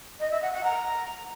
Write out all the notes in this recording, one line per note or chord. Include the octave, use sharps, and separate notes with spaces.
D#5
E5
F#5
F#5
A#5